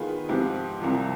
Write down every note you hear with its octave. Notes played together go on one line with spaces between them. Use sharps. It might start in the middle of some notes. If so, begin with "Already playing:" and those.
Already playing: D#3 B3 F4 G#4 B4
G#2 F3 C4 G4
C2 C3 F3